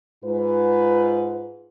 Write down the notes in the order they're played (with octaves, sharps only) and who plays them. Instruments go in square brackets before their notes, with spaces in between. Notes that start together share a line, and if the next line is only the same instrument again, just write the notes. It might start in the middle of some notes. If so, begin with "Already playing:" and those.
[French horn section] G#2 F4 B4